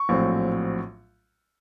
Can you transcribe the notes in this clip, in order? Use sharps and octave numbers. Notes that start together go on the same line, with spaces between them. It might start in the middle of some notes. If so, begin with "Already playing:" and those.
Already playing: C#6
A#1 A2 F#3 C4